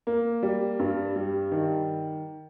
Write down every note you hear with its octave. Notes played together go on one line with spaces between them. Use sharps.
A#3
G3
G2
G3
D#3